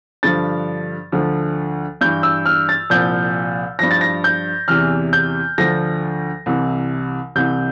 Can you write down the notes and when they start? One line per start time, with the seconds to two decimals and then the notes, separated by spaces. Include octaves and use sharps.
0.23 G2 D3 F3 A6
1.12 D2 D3 F3
2.01 G2 E3 G6
2.23 E6
2.46 F6
2.69 A6
2.90 C2 A#2 F3 G6
3.79 G2 F3 A#6
3.91 A6
4.01 A#6
4.24 G6
4.68 E2 C3 E3 F6
5.13 G6
5.58 D2 D3 F3 A#6
6.46 C2 C3 E3
7.35 C2 C3 E3 G6